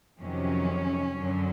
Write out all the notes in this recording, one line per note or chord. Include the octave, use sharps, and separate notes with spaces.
F2 C3 D#3 F#3 C#4
F#2 D3 F#3